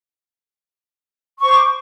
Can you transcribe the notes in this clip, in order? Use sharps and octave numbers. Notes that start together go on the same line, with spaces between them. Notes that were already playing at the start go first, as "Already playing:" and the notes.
C5 C#6 D6